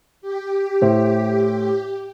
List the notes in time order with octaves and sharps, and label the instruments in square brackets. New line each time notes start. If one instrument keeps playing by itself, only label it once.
[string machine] G4
[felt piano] A2 C5